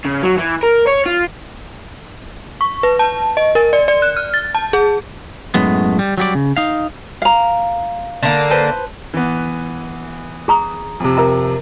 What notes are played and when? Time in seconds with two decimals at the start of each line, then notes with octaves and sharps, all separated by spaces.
0.05 C#3
0.23 F#3
0.38 E3
0.63 A#4
0.87 C#5
1.06 F4
2.61 C#6
2.83 B4
2.99 A5
3.37 D#5
3.55 A#4
3.73 D5
3.88 D5
4.02 F#6
4.17 F6
4.34 A6
4.55 A5
4.73 G#4
5.55 F#2 A2 G#3 B3
5.99 G3
6.18 F#3 G3 D5
6.35 C#3
6.57 D#4 F5
7.22 F5 A#5
8.23 D3 A#3
8.51 B4 C5 A5
9.14 E3 B3
10.48 G#4 A#5 D#6
11.00 F2 C3
11.17 A#4 E5 A#5